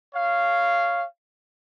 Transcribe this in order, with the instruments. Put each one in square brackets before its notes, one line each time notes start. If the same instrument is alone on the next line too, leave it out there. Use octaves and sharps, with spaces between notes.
[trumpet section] C#5 F5